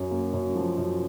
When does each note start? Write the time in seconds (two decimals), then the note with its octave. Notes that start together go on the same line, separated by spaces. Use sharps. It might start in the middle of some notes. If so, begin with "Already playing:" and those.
Already playing: F#2
0.11 A#3
0.33 F#2
0.56 F3
0.78 F#2